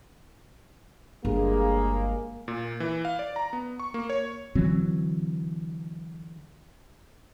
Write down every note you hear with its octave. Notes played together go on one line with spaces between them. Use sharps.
G1 G#3 A#3 G#4
A#2
E3
F5
D5
A#5
B3
C#6
A#3
C#5
D3 E3 F#3 C4